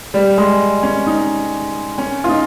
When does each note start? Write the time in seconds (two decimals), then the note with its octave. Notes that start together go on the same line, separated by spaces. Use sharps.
0.14 G3
0.38 G#3
0.83 C#4
1.07 D#4
1.98 C#4
2.24 F4
2.29 D#4